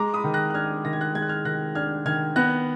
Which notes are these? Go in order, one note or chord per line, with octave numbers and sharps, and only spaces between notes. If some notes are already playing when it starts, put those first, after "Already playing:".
Already playing: G#3 A#5 D6
B5 D#6
D#3
F#6 A#6
F#6
D4 F6 G#6
D#3 A#6
G#6
F#6 A#6
G#3 G#6
F#6
F6 G#6
D#3 F#6 A#6
D4 F6 G#6
D#3 F6 G#6
B3 F#6 A#6